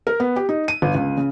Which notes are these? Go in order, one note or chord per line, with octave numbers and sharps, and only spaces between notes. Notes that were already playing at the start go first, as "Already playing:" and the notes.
A#4
B3
G4
D#4
D#7
G1
C#2
C#3